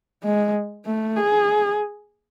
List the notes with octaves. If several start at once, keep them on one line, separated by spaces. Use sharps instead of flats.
G#3
A3
G#4